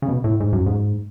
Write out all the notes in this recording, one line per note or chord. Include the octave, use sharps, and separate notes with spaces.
C#3
B2
A2
G#2
F#2
G#2